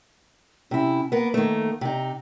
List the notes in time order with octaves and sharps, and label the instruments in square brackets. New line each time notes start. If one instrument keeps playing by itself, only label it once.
[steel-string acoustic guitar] C3 E4 [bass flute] C#4
[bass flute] A#3 [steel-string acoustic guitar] B3 A#4
[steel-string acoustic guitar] D#3 A3
C3 D#4